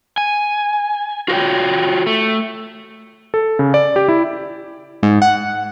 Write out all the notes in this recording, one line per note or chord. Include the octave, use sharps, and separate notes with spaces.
G#5
F4 F#4 A#4 C#5 G5
A3
A4
C#3
D5
G4
E4
G#2
F#5